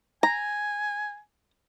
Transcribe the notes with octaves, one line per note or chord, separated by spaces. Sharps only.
G#5 A#5